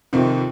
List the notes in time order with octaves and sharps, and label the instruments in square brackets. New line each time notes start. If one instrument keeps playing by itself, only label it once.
[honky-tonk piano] F2 C3 D#3 C4